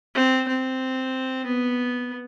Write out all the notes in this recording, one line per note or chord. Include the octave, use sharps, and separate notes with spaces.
C4
C4
B3